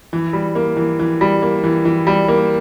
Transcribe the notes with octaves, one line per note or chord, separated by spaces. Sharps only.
E3
G3
A#3
E3
E3
G3
A#3
E3
E3
G3
A#3